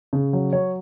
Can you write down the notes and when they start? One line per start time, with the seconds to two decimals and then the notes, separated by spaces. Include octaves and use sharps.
0.13 C#3
0.33 F#3
0.53 F#3 C#5